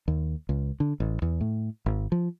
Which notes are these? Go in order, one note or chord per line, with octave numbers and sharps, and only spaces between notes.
D#2
C#2
D3
A1
E2
A2
G#1
F3